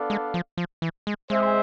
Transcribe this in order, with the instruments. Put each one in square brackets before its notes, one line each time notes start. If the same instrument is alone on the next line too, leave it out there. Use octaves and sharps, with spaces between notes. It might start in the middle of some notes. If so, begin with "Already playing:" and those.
Already playing: [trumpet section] B3 D4 A4 D5 F5
[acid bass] G#3
F3
F3
E3
G#3
[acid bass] G#3 [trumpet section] C4 G#4 C5 E5